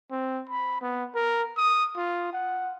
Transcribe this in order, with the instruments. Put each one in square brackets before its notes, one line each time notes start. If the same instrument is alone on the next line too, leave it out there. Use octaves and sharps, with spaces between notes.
[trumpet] C4
B5
B3
A#4
D#6
F4
F#5